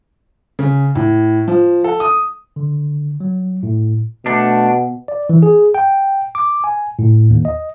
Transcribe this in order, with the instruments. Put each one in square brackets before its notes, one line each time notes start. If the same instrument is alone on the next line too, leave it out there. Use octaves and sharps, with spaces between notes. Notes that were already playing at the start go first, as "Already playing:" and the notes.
[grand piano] C#3
A2
F3
A4
D#6
[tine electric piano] D3
F#3
A2
[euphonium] B2 [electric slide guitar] A3 D4
[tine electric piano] D5
E3
G#4
G5
D6
G#5
A2
D#2
D#5